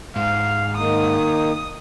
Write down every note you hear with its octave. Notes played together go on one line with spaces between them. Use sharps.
G#2 F5
D#3 A#3 D#4 D#6